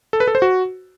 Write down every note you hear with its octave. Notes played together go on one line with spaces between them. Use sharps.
A4
B4
A4
C5
F#4